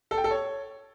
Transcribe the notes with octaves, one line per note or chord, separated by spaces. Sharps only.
A4
G5
A4
C#5